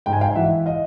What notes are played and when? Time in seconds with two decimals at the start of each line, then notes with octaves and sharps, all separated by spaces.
0.06 G#2 G5
0.13 G#5
0.21 F5 G5
0.35 E3 E5 F#5
0.66 D#5 F5